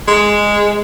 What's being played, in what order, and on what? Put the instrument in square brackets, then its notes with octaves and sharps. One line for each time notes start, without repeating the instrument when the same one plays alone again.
[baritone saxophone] G#3